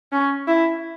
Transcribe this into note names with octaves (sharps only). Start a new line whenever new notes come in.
C#4
E4